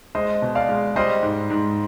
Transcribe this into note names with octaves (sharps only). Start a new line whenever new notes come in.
G#3 C5 D#5
B2
D5 F5
G#3
G3 C5 D#5
G#2
G#2